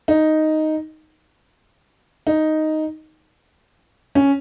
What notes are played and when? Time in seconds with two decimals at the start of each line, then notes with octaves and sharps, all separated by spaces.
0.08 D#4
2.27 D#4
4.15 C#4